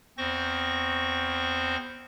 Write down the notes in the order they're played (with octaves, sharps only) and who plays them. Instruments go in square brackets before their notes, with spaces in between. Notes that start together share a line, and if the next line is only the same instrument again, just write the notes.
[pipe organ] E2 C4 C5 C#6 A#6